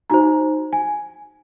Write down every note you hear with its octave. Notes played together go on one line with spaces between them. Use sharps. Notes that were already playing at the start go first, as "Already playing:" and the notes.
D#4 F#4 C5 A#5
G#5